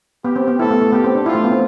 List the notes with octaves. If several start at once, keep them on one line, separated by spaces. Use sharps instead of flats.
B3 G4
C4
B3
A3 E4 A4
B3
A3
B3 G4
C4
D4
E4 F4
A3
B3
C4